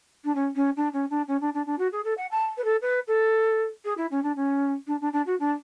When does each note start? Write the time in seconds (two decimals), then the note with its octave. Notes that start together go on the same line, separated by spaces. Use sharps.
0.24 D4
0.35 C#4
0.56 C#4
0.77 D4
0.93 C#4
1.10 D4
1.28 C#4
1.41 D4
1.54 D4
1.66 D4
1.79 F#4
1.92 G#4
2.04 A4
2.17 F#5
2.31 A5
2.57 B4
2.64 A4
2.82 B4
3.07 A4
3.85 G#4
3.97 E4
4.11 C#4
4.23 D4
4.36 C#4
4.87 D4
5.01 D4
5.13 D4
5.26 F#4
5.40 D4